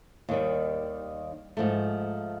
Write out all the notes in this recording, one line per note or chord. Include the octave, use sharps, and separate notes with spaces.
D#2 D#3 G3
G#2 F3 A3